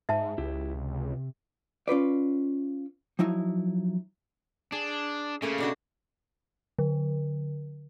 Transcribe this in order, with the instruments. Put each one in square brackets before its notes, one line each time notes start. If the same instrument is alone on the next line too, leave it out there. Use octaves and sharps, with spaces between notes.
[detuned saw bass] G#2 [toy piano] E5 A5
[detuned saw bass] C#2 [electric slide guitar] E4 G4
[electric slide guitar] C3
[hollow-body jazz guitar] C#4 F4 B4 D5
F3 F#3 D#4 E4
[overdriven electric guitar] D4 [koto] G#4
[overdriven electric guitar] C#3 [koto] A3 A#3 G#4
[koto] B2 D4 F#4
[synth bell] D3